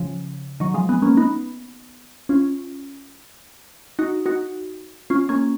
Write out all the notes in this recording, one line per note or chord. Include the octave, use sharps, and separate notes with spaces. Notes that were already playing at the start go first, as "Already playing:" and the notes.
Already playing: C#3 F3
D#3 F#3
F3 G#3
G#3 B3
A#3 C#4
B3 D#4
C#4 F4
D#4 F#4
D#4 F#4
C#4 F4
A#3 C#4